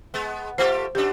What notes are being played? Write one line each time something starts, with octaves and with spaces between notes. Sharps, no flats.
G#3 B3
A3 F4 G4 C5
F#2 D4 G4